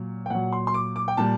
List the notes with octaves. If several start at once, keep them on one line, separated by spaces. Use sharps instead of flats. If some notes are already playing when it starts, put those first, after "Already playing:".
Already playing: A#2 F#3
G5
A#2 F#3 F#5
C6
C6
D6
D6
G5
A#2 G3 A5